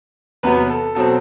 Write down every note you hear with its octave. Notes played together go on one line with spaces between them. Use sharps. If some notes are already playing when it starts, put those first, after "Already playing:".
E2 C3 F#3 B3 B4
A4
B2 F#3 C4 A4